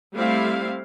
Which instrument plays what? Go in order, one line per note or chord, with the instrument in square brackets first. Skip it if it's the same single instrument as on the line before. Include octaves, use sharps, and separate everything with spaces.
[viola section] G3 A3 C4 E4 F5